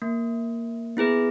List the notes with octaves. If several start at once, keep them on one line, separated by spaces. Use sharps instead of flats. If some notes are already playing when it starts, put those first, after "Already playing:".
A#3
B3 E4 G#4 B4